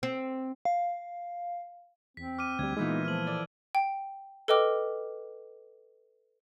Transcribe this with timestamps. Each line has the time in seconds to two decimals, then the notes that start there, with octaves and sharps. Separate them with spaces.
0.03 C4
0.65 F5
2.17 E2 C4 B6
2.38 D6 F6 D#7
2.59 D2 G3 G#6
2.77 A#2 E3 G#3 B3 D#4 E4
3.05 F3 F6 F#7
3.27 A4 D5
3.75 G5
4.48 A4 B4 D#5 G5 D6 F6